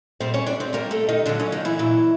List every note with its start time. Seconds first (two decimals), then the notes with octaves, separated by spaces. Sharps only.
0.20 A#2 G3 C4 C5
0.34 C#4 C#5
0.46 D4 D5
0.60 C4 C5
0.73 A#2 G3 A#3 A#4
0.91 A3 A4
1.09 D#3 D#4
1.26 A#2 D3 F#3 D4
1.39 C#3 C#4
1.52 D#3 D#4
1.65 E3 E4
1.79 A#2 F#3